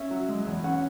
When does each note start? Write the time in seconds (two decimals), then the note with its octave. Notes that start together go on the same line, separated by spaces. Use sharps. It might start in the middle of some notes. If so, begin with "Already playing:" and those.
Already playing: C#4 E5
0.11 F#3
0.29 G#3
0.46 E2
0.64 C#4 F#5